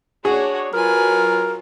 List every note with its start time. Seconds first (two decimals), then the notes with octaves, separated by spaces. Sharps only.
0.25 D4 F#4 G#4 C#5
0.74 F#3 F4 A#4 B4 G#5